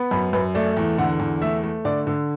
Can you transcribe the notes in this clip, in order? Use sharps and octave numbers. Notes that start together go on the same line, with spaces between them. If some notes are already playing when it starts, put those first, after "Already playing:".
Already playing: B3
F#2 B5
F#2 B4
A3 D5
E2
D3 F#5
E2
A3 E5
A3
D3 D5
D3